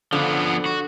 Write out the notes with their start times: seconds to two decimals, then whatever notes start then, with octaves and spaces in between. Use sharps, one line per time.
0.13 D3 F3 B3
0.66 F#4